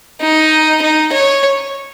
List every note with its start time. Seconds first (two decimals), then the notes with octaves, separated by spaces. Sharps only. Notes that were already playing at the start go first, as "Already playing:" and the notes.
0.21 D#4
0.82 D#4
1.12 C#5